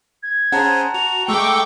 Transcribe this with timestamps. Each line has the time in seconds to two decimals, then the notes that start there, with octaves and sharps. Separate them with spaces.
0.23 G#6
0.52 C#4 G#4 C5 F#5 A5 A#5
0.94 F#4 F7
1.28 G#3 A3 G5 C#6 D6 E6